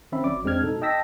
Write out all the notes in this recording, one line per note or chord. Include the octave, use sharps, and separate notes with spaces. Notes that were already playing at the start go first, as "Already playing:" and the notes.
D#3 C4 C#4 E5 B5
G1 F#3 D5 D6
F2 G#3 C4 D4 F6 G#6
B2 D#4 A4
D#5 G5 A5 E6 A#6 B6